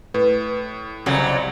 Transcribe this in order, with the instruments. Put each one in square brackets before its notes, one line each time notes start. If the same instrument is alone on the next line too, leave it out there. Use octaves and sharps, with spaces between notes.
[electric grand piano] A2 [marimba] B4
[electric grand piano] C2 [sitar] F2 A#2 F#3 [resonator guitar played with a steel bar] C#3 G3 F#5